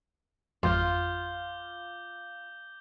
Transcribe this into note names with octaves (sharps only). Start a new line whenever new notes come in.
G#1 F2 F4 D6 G6 G7